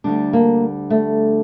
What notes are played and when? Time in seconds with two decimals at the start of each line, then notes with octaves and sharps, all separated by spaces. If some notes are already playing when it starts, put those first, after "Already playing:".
0.04 D2 D3 G3 D4
0.33 A#3
0.90 A3